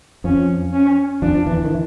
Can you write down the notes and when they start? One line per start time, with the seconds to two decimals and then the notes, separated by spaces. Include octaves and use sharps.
0.24 F2 F3 C#4
0.73 C#4
1.22 F2 F3 D4
1.47 E2 E3
1.64 D#3
1.71 E3